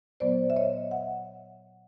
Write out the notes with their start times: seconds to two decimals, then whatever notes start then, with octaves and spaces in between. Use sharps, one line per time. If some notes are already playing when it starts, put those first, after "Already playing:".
0.20 A#2 F#3 B3 C5 D5
0.50 E5
0.56 C#5 D#5
0.91 E5 F#5